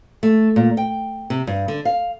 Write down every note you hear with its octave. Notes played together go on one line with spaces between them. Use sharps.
A3
A#2
G5
C3
G2
D3
F5